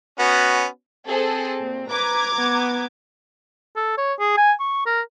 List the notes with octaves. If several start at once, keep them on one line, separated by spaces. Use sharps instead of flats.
B3 C#4 F#4
C4 G#4 A4 C5
A#2
B4 A#5 D6 G#6
B3
A4
C#5
G#4
G#5
C#6
A#4